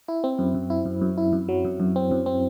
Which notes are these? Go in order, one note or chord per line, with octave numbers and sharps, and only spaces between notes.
E4
C4
F#2
F#2
E4
F#2
F#2
E4
F#2
F#3
F#2
F#2
C4
F#2
C4